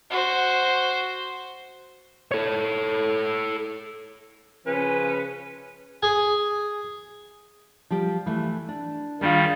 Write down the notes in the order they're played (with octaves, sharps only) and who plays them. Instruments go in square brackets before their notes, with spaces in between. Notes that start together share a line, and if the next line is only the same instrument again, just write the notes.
[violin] F#4 C5
[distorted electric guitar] A4 C#5
[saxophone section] C#3 F3 C#4 B4
[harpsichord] G#4 G#5
[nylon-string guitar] F3 G3 G4
E3 A3
D4
[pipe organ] D#3 G3 [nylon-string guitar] G#3 D4 F4